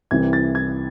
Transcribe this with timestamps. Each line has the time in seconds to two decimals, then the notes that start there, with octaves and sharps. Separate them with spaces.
0.11 C2 C3 E3 G#6
0.33 A6
0.55 G#6